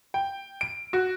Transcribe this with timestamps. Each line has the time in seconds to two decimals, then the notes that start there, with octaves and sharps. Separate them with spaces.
0.14 G5
0.61 D7
0.93 F#4